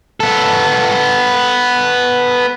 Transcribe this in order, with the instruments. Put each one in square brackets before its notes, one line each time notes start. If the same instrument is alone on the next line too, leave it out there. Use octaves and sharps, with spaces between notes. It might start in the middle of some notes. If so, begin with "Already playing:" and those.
[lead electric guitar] B3 A4